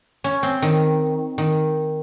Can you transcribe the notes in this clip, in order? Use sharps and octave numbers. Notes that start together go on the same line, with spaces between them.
C#4
C4
D#3
D#3